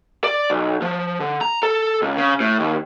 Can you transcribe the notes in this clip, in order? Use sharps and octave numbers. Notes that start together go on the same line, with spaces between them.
D5
B1
F3
D3
A#5
A4
C#2
C#3
A2
D#2